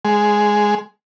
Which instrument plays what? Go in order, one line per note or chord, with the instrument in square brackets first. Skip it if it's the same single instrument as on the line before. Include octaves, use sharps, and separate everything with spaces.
[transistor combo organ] G#3